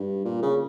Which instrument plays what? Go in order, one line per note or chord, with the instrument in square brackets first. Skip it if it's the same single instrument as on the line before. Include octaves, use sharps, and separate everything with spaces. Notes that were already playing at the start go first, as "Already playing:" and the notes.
Already playing: [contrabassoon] G2
A#2
C#3